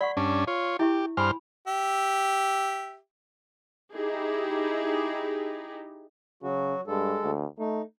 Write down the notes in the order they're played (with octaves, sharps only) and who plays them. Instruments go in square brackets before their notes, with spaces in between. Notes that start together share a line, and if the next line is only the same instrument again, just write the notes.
[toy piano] D5 F#5 C#6 [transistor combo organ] B5
[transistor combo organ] G2 C#4 D4
F4 C#5
[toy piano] E4 E5 C#6 [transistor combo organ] G4
[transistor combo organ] G2 C5 F6 [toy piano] G#5 B5
[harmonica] G4 E5
[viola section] D#4 E4 G4 G#4
[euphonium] C#3 [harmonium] F#3 F#4
[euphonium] G2 [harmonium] G#3 A4
[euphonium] D2
[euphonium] A3 [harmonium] D#4